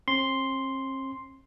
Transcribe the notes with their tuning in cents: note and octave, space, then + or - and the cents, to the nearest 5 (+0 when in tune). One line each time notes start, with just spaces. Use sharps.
C4 +45 C6 +0